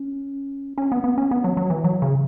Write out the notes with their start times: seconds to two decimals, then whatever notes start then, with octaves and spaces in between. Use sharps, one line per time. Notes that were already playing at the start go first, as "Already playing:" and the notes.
Already playing: C#4
0.78 C#4
0.92 B3
1.04 B3
1.18 C#4
1.31 B3
1.44 F#3
1.57 F#3
1.70 E3
1.84 F#3
2.02 C#3